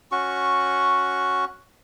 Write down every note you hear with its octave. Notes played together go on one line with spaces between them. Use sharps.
C#4 F#4 C#6